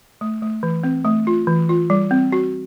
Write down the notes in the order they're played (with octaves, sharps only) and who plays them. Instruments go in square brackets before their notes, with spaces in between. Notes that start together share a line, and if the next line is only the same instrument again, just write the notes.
[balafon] A3
A3
E3
C4
A3
F4
E3
F4
G3
C4
F#4